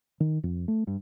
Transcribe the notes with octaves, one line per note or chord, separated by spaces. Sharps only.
D#3
F2
A3
G2